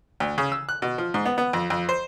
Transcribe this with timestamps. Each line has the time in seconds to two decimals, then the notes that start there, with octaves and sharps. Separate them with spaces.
0.20 D2
0.38 C#3
0.52 E6
0.69 F#6
0.82 B2
0.98 F3
1.14 G#2
1.25 B3
1.38 B3
1.53 F2
1.70 F2
1.89 C5